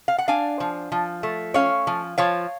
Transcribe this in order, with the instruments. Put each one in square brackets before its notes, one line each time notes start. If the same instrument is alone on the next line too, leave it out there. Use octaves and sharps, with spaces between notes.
[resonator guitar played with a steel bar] F5
F#5
D4 F5 G#5
F3
F3
A3
C#4 C#5 F5
F3
F3 C#5 F5